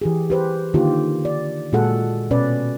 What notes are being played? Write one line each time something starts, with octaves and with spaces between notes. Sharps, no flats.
E3 G4 G#4
G4 B4 C5
D3 D#3 A#3 D#4 F4 G4
D5
A#2 G#3 F#4 G#4 A4 F#5
B2 C#4 B4 D5